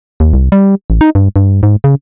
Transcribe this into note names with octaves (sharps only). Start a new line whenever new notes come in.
D#2
C2
G3
A1
D#4
G2
G2
G#2
C#3